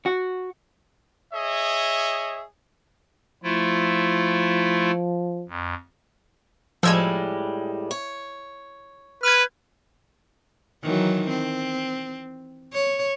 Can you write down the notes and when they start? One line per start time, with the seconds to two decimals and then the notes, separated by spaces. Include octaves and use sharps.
0.06 F#4
1.33 G#4 C#5 D#5 E5
3.44 F3 A3 E4 F4
5.48 F2
6.83 A2 F3 G3 G#3 E6 G#6
7.91 C#5
9.23 B4 F6 G#6
10.84 D#3 E3 F#3
11.29 C4
12.73 C#5